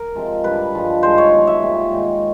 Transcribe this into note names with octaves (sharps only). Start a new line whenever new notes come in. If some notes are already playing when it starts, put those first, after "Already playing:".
Already playing: A#4
C3 F3 G#3
G2 D3 G3 B4
G2 D3 F3 G#3
G2 D#3 G#3 C5
C#5
B2 F#3
E5
A#2 G3
G#2 D#3 G#3